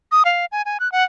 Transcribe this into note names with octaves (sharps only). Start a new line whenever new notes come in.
D#6
F5
G#5
G#5
F#6
F#5